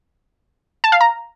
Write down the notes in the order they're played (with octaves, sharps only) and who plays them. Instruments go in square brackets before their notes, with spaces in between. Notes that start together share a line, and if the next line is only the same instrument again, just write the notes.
[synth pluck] A5
F5
A#5